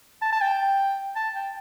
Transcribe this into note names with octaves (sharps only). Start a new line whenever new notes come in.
A5
A5
G5
A5
G5